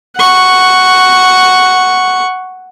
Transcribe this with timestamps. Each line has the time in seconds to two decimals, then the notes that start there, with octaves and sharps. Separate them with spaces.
0.16 F#5 C#6